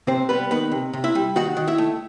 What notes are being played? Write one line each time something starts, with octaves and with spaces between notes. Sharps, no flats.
C3 C4 C5
G3 B3 B4
D#3 B3 B4
C3
C3
E4 E5
G3
D#3 F#4 F#5
D#3
E4 E5
A3